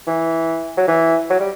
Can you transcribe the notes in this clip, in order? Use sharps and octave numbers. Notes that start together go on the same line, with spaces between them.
E3
F#3
E3
F#3
G3